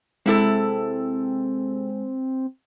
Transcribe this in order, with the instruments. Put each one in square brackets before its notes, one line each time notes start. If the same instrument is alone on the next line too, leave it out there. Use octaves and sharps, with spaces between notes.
[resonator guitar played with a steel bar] C3 E4 A4 [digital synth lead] G#3 [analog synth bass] C4